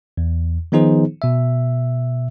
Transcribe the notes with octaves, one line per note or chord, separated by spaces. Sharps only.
E2
D#3 F3 B3 D#4 G#4 C5
B2 E5